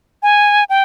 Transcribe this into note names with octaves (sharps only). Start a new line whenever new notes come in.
G#5
G5